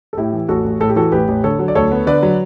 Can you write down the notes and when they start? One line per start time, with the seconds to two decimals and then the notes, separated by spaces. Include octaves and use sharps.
0.13 A4
0.17 A2 E4 G4
0.33 E3
0.49 A1 F#4 A4
0.64 A1
0.80 A2 A4
0.89 G4
0.96 E3 F#4 A4
1.12 A1 G4 B4
1.28 A1
1.43 D3 A4 C#5
1.59 F#3
1.68 D5
1.75 D2 A4 C#5
1.92 B3
2.07 D3 B4 D5
2.23 F#3